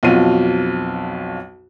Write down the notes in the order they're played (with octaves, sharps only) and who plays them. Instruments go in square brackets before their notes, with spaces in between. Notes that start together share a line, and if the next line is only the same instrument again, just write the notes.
[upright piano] B1 F2 F4 F#4 D#7